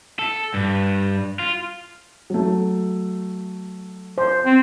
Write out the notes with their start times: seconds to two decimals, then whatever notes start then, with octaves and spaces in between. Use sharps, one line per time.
0.19 A4
0.54 G2
1.39 F4
2.30 F#3 A3
4.18 C5
4.46 C4